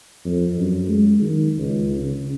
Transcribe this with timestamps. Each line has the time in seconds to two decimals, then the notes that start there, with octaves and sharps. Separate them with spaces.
0.25 F2
0.58 F#2
0.88 G#3
1.22 D#3
1.58 C#2
2.01 C#3